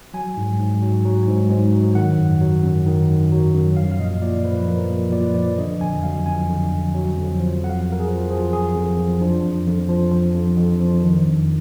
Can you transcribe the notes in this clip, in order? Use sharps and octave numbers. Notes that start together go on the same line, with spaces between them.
F#3 G#5
G#2
G#2
F#3
F#3
G#2
G#2
F#3
D#3 F#5
F#2
F#3
F#2
D#3
F#2
F#3
F#2
F3 F5
F5
A#2 D#5
A#2 D5
F3 B4
B4
F3 A#4
A#2
A#2 D5
B4
F3 D5
D3 D#5
F2 G#5
F#3 F5
F2 G#5
D3
F2
F#3
F2
F3
F2 F#5
F5
F2
A#4
G#4
F3
F3 G#4
F2 G#4
F2
F3
F3 D4
F2
F2
F3
F3
F2
F2
F3
D#3
F2